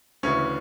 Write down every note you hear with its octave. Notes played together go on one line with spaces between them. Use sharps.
D2 C#3 E3 C#4